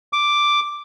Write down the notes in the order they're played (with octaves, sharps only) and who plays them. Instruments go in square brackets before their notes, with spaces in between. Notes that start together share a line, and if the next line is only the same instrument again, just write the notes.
[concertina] D6